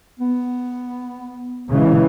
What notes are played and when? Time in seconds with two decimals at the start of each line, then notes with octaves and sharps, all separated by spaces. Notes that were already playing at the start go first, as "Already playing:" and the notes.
0.20 B3
1.71 C#3 E3 G#3